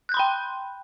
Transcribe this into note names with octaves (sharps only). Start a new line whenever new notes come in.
G5 B5 C6 F#6 G6